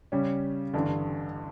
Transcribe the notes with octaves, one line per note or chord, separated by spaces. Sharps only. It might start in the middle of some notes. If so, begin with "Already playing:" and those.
C#3 G3 C#4
A1 G2 D3